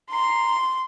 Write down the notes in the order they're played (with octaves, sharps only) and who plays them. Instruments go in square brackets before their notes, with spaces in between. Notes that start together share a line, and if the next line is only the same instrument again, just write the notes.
[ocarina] A#5 [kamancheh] C6